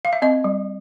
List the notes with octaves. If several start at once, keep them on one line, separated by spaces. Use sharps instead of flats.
F5
E5
C4 D#5
G3